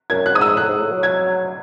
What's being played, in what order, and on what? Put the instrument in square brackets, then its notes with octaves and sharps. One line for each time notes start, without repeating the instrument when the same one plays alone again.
[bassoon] F#2 [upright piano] G#6
[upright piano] F#6
[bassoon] G#2 [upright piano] D#6
[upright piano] E6
[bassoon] A2 [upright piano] F#6
[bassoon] G#2
A2
F#3
[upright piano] G#6